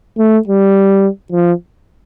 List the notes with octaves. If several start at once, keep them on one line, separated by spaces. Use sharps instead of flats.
A3
G3
F3